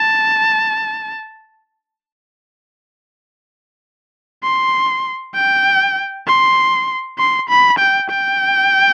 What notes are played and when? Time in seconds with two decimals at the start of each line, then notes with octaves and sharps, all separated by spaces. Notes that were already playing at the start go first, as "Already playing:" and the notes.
Already playing: A5
4.43 C6
5.34 G5
6.27 C6
7.18 C6
7.49 B5
7.79 G5
8.10 G5